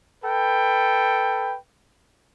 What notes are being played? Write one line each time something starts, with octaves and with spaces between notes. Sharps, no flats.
A4 B4 G5